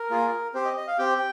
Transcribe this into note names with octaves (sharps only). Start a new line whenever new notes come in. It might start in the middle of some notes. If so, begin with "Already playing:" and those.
Already playing: A#4
A#3 F4 G#4
C4 G4 C5
D#5
D#5
F5
C4 G4 G5